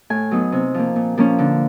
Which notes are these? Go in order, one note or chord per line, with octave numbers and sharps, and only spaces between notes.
A2 G#5
F#3 B3 D#4
C3
F3 A#3
A#2
F3 A#3 C#4
D3